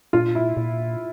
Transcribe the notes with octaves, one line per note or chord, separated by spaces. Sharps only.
A#2 F4
E4
A#2